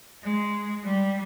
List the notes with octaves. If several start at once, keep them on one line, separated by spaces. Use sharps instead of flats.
G#3
G3